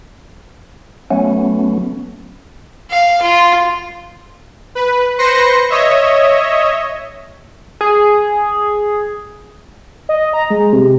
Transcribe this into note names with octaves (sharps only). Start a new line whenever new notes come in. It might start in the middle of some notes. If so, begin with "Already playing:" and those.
F#3 A3 B3 C#4
F5
F4
B4
B4 C5 C6 A#6 C#7
C#5 D#5 E5
G#4
D#5
A#5
G#3
C3